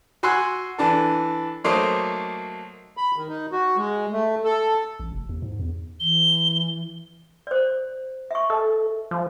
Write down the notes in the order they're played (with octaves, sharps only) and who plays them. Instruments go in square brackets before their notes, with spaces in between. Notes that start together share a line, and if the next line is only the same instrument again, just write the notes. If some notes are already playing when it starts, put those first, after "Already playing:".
[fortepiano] F#4 G#5 C6 E6 F#6
E3 D4 A4
F#3 A3 A#3 D#4 C5 D5
[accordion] B5
D#3
D#4
F#4
G#3
A3
A4
[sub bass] A1
F1
D#2
G#2
E2
[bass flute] E3 [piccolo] G7
[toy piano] C5 D5
E5 C#6
[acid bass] A4 [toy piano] D#5
[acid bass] F3